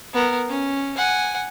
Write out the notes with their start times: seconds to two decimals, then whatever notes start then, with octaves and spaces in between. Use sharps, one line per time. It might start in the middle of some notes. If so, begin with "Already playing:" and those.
0.13 B3 A#4
0.49 C#4
0.96 F#5 G#5